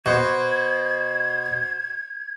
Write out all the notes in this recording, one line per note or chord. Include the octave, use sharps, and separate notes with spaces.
B2 F#4 C5 G#6